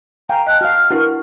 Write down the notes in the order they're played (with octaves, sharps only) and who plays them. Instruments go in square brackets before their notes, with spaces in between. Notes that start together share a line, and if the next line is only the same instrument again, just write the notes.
[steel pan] F5 G5 G#5 [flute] A#5
[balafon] D#5 A5 [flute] F#6
[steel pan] F#4 F5 [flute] F6
[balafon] D4 E4 A#4 [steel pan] F#4 B4